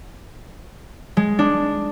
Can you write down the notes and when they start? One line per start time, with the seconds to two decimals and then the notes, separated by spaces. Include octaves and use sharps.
1.17 G#3
1.39 D4